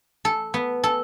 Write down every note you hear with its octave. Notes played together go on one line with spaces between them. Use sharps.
A4
B3
A4